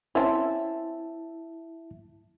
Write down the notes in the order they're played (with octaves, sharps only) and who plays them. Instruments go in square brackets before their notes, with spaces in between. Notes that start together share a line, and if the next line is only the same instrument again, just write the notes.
[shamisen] C4 C#4 [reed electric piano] E4 E5 A5